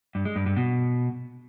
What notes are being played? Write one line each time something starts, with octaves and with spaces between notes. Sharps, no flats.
G2
G#3
G2
G2
B2